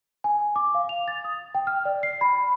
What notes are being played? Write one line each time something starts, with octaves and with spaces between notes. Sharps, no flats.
G#5
D6
F5
F7
A6
D#6
G5
F6
D5
C7
B5